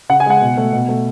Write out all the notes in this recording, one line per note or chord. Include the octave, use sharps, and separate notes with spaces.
C#3 F#5
G#5
G#3 F#5
B2
A3
B2
A3